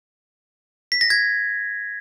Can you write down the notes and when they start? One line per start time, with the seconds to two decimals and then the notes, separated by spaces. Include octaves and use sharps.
0.92 B6
1.01 A#6
1.10 G#6